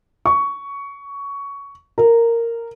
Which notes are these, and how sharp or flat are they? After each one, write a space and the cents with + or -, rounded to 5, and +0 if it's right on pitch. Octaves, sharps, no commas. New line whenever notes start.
C#6 +15
A#4 -10